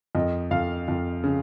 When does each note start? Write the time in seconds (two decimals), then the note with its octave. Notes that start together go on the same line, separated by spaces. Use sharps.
0.15 F2 D#5
0.51 F2 F5
0.88 F2
1.24 C#3